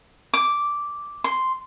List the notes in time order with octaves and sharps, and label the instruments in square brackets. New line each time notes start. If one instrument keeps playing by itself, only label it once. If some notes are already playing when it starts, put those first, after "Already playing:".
[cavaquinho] D6
C6